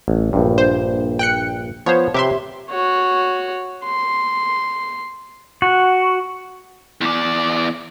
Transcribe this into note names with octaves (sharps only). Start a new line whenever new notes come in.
A1
A#1 G2
C5
G5 F#6 C#7
F3 B3 C5 C#5
C3 G4 B4 E5 C6
F#4 C#5
C6
F#4
E2 D5